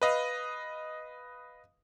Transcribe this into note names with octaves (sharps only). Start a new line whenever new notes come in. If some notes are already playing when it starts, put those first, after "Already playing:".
B4 D#5 F5